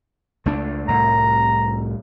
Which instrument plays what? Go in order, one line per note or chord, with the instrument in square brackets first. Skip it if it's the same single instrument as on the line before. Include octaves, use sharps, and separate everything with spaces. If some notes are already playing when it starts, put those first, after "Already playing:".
[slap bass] C#2 A3 D4
[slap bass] C2 A2 [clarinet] A#5